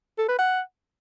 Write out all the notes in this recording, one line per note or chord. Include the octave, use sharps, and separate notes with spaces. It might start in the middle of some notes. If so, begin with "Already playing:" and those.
A4
B4
F#5